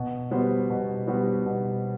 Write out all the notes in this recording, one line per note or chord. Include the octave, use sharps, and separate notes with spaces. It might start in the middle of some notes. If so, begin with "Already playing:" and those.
Already playing: B2
G3 B3 F#4 C5
B2
G3 B3 F#4 C5
B2